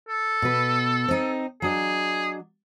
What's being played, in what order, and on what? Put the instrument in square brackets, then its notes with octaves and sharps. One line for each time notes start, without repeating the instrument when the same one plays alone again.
[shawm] A4
[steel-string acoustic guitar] B2 B4
C4 D#4
[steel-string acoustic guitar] F#3 D4 D#5 [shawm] G#4